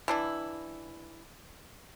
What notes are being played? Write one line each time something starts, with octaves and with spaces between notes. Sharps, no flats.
E3 D4 E4